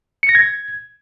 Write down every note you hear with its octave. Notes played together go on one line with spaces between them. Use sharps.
C#7
A#6
G#6